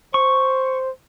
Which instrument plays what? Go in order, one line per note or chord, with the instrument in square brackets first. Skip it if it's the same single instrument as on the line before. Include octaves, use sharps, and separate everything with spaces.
[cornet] C5 [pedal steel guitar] C#6